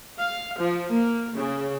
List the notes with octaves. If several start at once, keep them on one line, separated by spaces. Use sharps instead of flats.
F5
F3
A#3
C#3